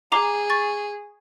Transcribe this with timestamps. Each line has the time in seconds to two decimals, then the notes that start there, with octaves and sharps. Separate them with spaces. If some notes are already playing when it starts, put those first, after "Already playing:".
0.12 G#4 A#5 D6 C7
0.50 C#6 A6